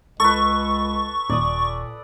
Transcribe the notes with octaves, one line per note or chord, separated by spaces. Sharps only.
C#2 A4 B4 C#6
D#1 A#2 D5 D#6